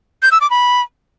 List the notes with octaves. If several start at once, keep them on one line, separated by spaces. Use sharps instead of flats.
G6
E6
D6
B5